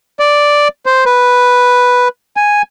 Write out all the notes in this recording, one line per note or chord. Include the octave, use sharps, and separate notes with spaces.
D5
C5
B4
G#5